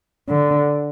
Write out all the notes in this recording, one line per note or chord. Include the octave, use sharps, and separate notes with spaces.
D3